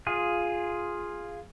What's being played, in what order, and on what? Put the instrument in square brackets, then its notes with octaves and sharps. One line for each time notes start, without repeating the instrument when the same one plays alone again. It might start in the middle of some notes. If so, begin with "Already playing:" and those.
[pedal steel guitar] F4 G#4